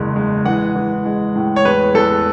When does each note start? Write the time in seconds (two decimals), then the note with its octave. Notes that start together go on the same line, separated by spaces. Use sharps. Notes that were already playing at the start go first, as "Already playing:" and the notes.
Already playing: F#1 E2 G#3
0.16 G#3
0.45 E3 F#5
0.76 E3
1.06 G#3
1.36 A2
1.56 C#5
1.65 E2 B4
1.94 E2 A4